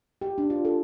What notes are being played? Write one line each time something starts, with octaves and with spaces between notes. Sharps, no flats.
G4
D4
F4
A4